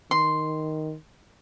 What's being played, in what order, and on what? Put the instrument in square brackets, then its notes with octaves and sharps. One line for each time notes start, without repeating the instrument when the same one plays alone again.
[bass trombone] D#3 [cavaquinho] C6